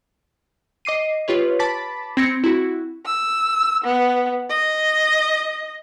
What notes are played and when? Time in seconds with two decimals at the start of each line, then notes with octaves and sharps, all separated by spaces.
0.85 D#5 D6 C7 D#7
1.28 F4 G4 B4 C#5
1.59 A5 B5 D6 A6 B6
2.17 C4 G#6 A#6 C#7
2.44 E4 F#4
3.05 E6
3.84 B3
4.50 D#5